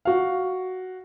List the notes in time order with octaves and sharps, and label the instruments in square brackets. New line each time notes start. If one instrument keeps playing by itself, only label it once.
[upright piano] F#4 F5